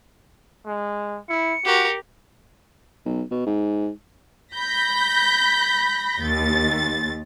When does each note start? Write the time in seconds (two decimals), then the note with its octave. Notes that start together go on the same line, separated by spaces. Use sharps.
0.66 G#3
1.29 E4 C#7
1.65 F#4 G4 A#4
3.06 B1
3.31 B2
3.47 G#2
4.54 B5 G6 A#6 B6
6.21 D#2 A6